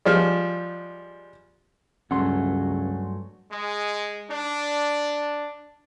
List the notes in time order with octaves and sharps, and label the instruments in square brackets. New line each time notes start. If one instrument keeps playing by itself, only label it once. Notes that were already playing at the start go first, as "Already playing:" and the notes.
[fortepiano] F3 G3 G#3
[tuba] C#2 [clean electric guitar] G2 F#3 A3 [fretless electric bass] C#4 [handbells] F#5 G#5 C6
[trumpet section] G#3
D4